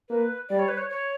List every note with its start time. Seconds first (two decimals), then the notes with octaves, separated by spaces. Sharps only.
0.09 A#3 B4
0.49 G3 D5
0.59 C#5
0.68 B4
0.78 C#5
0.90 C#5